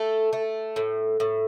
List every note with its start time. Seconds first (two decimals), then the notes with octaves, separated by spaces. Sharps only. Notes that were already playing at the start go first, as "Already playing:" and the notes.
Already playing: A3 A4
0.33 A3
0.76 A2
1.20 A2